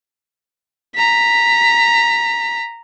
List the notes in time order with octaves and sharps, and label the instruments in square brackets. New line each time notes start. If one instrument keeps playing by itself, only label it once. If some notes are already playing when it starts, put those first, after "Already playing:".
[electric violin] A#5 B6